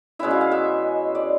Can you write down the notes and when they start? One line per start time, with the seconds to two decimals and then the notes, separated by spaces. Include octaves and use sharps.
0.19 B2 G#3 C#4 E4 E5
0.31 F5
0.41 F5
0.51 E5
1.15 D5